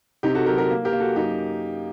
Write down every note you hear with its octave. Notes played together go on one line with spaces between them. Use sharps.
C3 D#4 G4
F#4 A4
F#3 G4 A#4
G4 A#4
A#3
G4 A#4
A#3
F#4 A4
F#2 D#4 G4